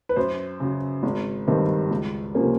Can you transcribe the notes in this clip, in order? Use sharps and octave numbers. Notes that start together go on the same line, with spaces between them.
B4
F#2 C5
C#3 F#3
G#1
G2 D#3 G3 C4
C#2
C3 F3 A#3 C#4